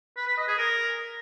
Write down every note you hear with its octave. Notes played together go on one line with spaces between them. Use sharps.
B4
B4
D#5
G#4
A#4